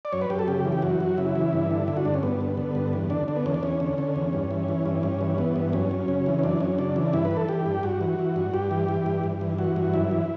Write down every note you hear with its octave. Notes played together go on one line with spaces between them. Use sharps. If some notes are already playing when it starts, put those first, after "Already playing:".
D5
F#2 C#5
B4
F#2 G4
A4
C#3 G4
E3
G4
F#2 F#4
F#2
C#3 E4
E3
G2
D3
D3 E4
F#4
G2 D4
C#4
G2 B3
D3
D3
G2
E2
D3 D4
D3 D4
B3
E2 C#4
D4
E2 C#4
D3
D3
E2
G2
E3
E3
G2
G2 C#4
E3
E3 B3
G2
F#2 C#4
F#2
C#3
E3
C#4
F#2 D4
F#2 C#4
C#3 D4
E3
G2 E4
B4
E3
A4
E3 G4
G2
G2 F#4
E3
E3
G2
G2 G4
E3
E3
G2
G2
E3
E3 F#4
G2
F#2 E4
E3